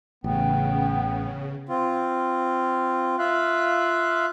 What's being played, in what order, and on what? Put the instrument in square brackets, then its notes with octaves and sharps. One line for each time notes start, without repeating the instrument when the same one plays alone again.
[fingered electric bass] A1 [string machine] C#3 [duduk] B3 [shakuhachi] G5
[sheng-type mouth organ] C4 F4
F4 E5 F5 F#6